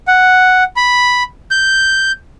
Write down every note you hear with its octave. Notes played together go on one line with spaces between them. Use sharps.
F#5
B5
G6